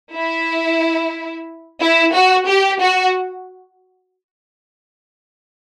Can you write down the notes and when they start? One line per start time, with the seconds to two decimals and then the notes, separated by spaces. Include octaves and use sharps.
0.14 E4
1.80 E4
2.14 F#4
2.48 G4
2.80 F#4